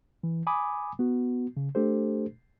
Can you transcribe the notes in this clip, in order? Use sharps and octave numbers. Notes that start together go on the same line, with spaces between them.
E3
G#5 B5 D6 D#6
B3 F#4
C#3
A3 D4 G4 A4 C5